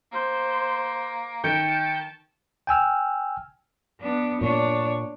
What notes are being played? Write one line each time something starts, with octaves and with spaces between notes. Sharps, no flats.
A#3 C5
D#3 G5 A5 G6 C#7 D7
G5 G#5 E6 F6
B3 D4
A#2 D4 C#5